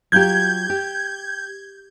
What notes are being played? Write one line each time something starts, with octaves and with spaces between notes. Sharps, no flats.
F#3 F4 G4 G6 G#6
G4